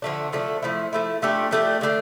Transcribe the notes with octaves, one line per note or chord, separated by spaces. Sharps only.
D3 F3 A3 D4
D3 F3 A3 D4
F3 A3 E4
F3 A3 E4
F3 A3 D4 G4
F3 A3 D4 G4
D3 A3 D4